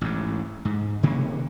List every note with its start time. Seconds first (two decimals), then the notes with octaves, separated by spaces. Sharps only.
0.01 A1 G#2
0.65 G#2
1.03 C3 D#3 A#3 C#4